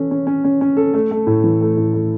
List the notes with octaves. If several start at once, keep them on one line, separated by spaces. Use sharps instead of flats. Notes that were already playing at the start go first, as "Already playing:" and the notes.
Already playing: E3 C#4 A4
C#4
C#4
C#4
C#4
A4
A3
A3
A2
E3
A3
A2
A3